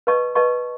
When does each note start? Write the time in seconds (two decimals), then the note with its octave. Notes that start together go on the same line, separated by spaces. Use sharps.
0.07 B4 D#5 A5 C#6
0.35 B4 D#5 A5 C#6